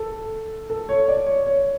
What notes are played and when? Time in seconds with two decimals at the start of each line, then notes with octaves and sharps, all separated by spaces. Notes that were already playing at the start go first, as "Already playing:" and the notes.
Already playing: A4
0.70 A4
0.89 C#5
1.08 D5
1.26 C#5
1.46 C#5